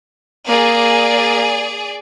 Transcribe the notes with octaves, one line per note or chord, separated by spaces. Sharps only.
A#3 G#4 D5